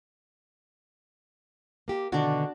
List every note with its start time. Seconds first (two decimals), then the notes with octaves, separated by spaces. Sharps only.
1.88 A#3 G4
2.12 B2 D3 D#3 D4 F#4